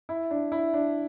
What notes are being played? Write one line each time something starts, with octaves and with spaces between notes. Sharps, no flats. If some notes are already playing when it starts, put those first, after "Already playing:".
E4
D4
E4
D4